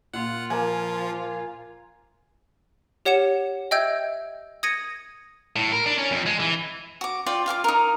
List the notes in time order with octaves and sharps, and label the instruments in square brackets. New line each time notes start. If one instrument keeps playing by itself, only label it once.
[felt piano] A#2 [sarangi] F4 [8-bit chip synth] F#5
[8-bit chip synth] F3 [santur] A#3 G#5
[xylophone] G4 C#5 F#5 C#7 E7
D#5 E5 G5 E6 G6 G#6
D#6 G#6 A#6 C#7 D#7
[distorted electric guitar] A2
A#4
D4
C#4
F2
G#3
E3
[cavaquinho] F#4 D6
F4 D5 G5
F4 F5 G5 D6
D#4 A#4